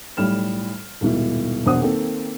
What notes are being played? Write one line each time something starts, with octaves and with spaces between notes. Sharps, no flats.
B1 A2 G3 F6 E7
D#1 G#2 B2 E4
E1 A#1 B2 C5 F#5 D#6
D#3 A#3 C4 A4